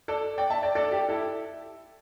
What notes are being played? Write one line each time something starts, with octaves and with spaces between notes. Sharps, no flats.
A4 D5
D5 G5
E5 A5
D5 G5
A4 D5
G4
E4 A4